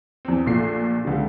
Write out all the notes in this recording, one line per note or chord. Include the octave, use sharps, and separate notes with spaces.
E2 C4
A#1 A#2 A3 C7
C#2 D3